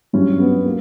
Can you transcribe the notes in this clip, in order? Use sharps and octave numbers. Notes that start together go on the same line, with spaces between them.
G2 F#3 C#4
B3
A#3